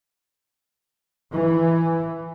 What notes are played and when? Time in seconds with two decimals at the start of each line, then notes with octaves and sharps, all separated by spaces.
1.33 E3